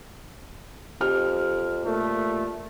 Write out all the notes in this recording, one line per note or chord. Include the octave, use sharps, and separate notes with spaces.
F2 G4 F6
A#2 A3